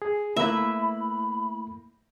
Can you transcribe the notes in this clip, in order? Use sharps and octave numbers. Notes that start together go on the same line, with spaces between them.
G#4
A3 A#3 E4 B4 E5 B5